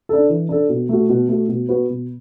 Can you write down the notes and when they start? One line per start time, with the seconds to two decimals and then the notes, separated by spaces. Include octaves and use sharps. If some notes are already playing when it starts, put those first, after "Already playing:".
0.09 D4 A4
0.29 E3
0.49 D4 A4
0.69 B2
0.89 A3 F#4
1.09 B2
1.29 A3 F#4
1.48 B2
1.69 B3 F#4 B4
1.89 B2